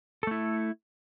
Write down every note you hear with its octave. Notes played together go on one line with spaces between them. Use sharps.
A3 E4 A4